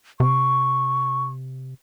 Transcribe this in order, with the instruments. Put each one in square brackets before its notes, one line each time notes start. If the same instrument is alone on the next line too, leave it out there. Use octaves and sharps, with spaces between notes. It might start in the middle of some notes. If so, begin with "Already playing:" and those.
[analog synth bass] C3 [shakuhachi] C#6